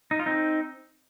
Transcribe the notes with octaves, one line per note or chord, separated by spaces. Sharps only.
D#4
F4
C4 D#4